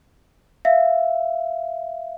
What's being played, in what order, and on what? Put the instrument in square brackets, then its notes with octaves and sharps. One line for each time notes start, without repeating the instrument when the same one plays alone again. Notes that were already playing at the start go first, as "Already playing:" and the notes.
[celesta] E5 F5